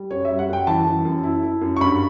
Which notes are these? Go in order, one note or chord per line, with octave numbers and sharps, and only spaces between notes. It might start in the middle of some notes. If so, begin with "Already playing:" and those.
Already playing: G3
F#2 C#5
G3 E5
F#5
F#2 G5
E3 A5
E3
F#2
E4
E4
F#2
C#6
G2 B5